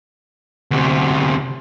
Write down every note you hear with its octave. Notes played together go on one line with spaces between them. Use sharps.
D2 C3